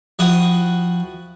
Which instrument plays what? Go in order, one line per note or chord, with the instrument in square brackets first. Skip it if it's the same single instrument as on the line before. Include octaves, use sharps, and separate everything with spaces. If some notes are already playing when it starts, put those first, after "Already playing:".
[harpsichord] F3 E4 F#4 G5 D#6